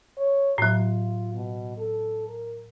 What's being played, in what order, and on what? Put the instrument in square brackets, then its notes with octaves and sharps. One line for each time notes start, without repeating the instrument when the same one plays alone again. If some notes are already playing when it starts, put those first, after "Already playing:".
[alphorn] C#5
[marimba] A2 F#3 [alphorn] F4
[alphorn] B2
A4
A#4